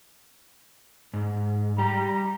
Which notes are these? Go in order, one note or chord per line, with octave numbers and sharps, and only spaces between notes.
G#2
G3 G4 A#5